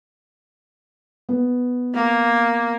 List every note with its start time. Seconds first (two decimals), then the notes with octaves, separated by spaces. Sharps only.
1.29 B3
1.94 A#3